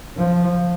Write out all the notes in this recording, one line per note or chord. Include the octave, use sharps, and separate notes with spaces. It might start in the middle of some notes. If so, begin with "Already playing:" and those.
F3